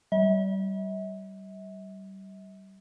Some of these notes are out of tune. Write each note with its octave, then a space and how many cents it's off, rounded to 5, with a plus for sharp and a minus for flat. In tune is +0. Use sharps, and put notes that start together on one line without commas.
G3 -25 E5 -40